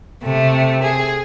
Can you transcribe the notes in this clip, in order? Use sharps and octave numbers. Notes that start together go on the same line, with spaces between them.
C3 A3
G#4